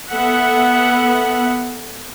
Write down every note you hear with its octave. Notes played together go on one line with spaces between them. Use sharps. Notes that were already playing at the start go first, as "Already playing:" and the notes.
B3 A4 E5 F#5